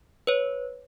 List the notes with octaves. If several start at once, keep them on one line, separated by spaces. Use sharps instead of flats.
B4 C#5